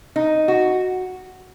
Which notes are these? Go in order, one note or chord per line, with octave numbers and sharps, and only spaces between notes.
D#4
F#4